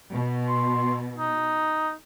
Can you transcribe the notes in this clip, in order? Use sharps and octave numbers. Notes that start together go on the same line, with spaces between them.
B2
C6
D#4